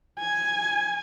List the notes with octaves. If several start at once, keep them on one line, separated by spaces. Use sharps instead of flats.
G#5